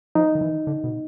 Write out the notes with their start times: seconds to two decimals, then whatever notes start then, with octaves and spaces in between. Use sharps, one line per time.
0.15 F3 D#4
0.35 D#3
0.41 E3
0.67 D3
0.84 B2